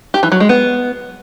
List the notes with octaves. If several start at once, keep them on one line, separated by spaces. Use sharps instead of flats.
G4
E3
F#3
G#3
B3